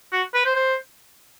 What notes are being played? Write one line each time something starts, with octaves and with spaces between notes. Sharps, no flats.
F#4
B4
C5
C5